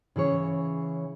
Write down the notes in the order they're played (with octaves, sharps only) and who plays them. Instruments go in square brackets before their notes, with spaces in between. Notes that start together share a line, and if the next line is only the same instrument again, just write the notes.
[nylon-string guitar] C#3 E3 G#4 C#5